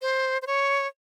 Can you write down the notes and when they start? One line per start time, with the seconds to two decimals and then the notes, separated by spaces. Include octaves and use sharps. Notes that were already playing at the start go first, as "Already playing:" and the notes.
0.01 C5
0.42 C5
0.47 C#5